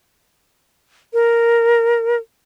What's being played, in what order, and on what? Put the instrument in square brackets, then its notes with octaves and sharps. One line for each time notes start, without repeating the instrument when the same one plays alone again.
[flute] A#4